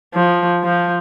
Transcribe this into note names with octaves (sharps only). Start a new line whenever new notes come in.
F3
F3